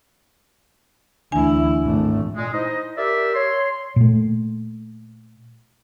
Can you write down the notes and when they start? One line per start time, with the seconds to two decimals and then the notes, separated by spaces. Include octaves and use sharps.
1.32 D2 E3 D4 E4 G#5
1.84 G#1 A3
2.36 A#2 G#3
2.53 D#4 E4 C5 D#5
2.97 G4 A#4 D5 E5
3.34 C#5 C6
3.96 A#2 A3